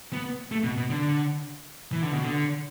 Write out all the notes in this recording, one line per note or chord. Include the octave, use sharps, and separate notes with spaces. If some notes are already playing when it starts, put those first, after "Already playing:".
B3
A3
B2
B2
D3
E3
D3
B2
D3